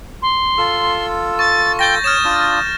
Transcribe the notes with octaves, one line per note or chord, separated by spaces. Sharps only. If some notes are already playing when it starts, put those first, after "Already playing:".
C6
F4 A4 E6
C#6 A6
G5 G6 A6 A#6
C#5 D#6 F6 A6 E7
D4 F4 D5